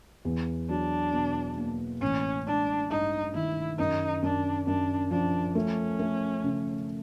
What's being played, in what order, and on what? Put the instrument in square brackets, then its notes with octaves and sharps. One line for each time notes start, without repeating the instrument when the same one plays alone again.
[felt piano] E2
[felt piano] F#3 [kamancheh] D4
[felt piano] B2
A#3
[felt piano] A1 [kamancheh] C#4
[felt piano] G#3 [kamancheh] D4
[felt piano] G2 [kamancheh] D#4
[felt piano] D#3 [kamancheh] E4
[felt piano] F#2 [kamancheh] D#4
[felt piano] F#2 [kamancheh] D4
[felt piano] F#2 [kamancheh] D4
[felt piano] F3 [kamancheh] D4
[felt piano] A3 [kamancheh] C#4
[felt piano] A3
C#3